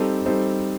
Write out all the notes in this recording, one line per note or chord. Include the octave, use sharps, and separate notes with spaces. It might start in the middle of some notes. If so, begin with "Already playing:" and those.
Already playing: G3 C4 D#4 A4 C5
G3 C4 D#4 A4 C5